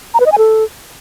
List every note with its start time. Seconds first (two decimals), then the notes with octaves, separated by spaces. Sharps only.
0.14 A#5
0.20 B4
0.26 D#5
0.32 G#5
0.38 A4